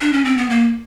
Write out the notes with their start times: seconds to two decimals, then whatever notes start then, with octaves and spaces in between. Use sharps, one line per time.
0.00 D4
0.13 C#4
0.25 C4
0.37 B3
0.50 A#3